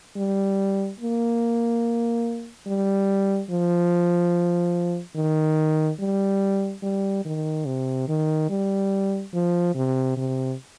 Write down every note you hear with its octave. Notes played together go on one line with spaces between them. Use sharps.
G3
A#3
G3
F3
D#3
G3
G3
D#3
C3
D#3
G3
F3
C3
C3